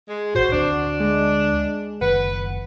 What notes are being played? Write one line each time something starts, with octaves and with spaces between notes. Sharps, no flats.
G#3
G#1 A2 F#4 C5
D2 G3 C4 D4
G#3
F#1 D#3 B4 F#5